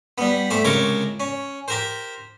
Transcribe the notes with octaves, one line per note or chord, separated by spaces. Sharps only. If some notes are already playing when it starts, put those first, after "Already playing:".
G3 B3
A3 G4 C5
C#2 C3 A#4 C#5 D6
C#4
G4 A#4 C5